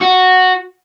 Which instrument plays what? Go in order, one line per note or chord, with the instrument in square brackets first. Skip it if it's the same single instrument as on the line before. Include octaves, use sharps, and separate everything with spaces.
[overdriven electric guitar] F#4